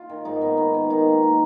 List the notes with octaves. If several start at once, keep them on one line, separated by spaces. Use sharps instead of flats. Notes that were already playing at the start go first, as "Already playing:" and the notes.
Already playing: F4
D#3
G#2 D#4
B3
D#3
D#3
D#3 D#4
A#3
D#4